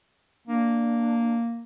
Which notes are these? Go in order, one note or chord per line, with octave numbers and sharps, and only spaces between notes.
A#3 D4